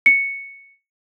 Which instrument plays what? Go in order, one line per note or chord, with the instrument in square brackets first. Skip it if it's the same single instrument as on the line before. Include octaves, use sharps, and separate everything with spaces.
[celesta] C#7